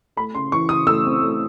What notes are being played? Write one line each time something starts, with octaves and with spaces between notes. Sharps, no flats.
A3 B5
C#3 C6
E3 C#6
C#3 D#6
A3 E6
C4
A3